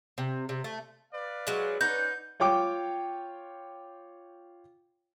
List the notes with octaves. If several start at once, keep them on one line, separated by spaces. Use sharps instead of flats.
C3
C3
A3
B4 D5 F5
F#3 G#3
C#4 D#4 B4 D5 F#5 G6
F4 C#5 G5 D6